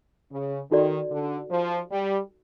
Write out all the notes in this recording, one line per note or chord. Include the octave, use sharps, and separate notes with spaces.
C#3
D#3 D#4 F#4 A4 D5
D3
F3
G3